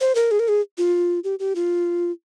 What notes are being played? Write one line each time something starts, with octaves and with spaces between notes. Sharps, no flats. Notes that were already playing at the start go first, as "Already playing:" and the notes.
C5
A#4
G#4
A#4
G#4
F4
G4
G4
F4